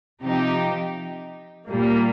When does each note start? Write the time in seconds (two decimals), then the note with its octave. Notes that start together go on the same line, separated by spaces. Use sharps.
0.21 C3 F3 D#4 G4
1.68 A#2 G3 A#3